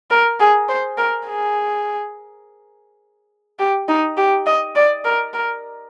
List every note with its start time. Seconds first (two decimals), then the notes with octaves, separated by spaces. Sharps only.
0.11 A#4
0.40 G#4
0.69 C5
0.98 A#4
1.27 G#4
3.59 G4
3.88 D#4
4.17 G4
4.46 D#5
4.75 D5
5.05 A#4
5.34 A#4